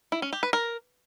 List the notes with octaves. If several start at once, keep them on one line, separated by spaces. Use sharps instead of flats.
E4
C#4
G4
B4
A#4